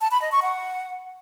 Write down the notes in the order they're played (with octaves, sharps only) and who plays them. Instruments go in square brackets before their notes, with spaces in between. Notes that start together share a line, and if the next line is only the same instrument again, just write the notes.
[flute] A5
B5
D#5
C#6
F#5